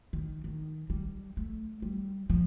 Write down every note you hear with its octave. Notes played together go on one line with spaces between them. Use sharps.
D#3
D#3
G3
A3
G3
F3